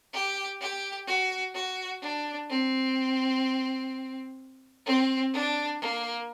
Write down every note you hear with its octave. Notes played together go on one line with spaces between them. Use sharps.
G4
G4
F#4
F#4
D4
C4
C4
D4
A#3